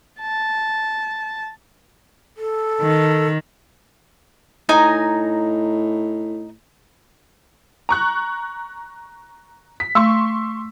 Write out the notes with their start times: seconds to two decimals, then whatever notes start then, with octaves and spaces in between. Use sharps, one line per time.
0.22 A5
2.37 A4
2.82 D#3
4.69 A2 D#4 G#5 A#5
7.89 A#5 C#6 F#6
9.80 B6
9.95 A3 C6 C#6 E6